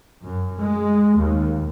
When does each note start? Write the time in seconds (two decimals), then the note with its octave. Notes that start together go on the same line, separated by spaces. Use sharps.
0.24 F#2
0.61 G#3
1.18 D#2